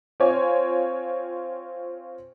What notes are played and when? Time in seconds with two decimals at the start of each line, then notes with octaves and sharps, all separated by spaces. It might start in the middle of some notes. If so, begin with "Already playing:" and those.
0.20 C4 F4 C5 C#5 G#5